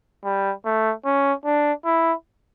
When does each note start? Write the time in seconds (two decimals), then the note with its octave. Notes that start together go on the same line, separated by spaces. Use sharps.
0.25 G3
0.65 A3
1.05 C#4
1.45 D4
1.85 E4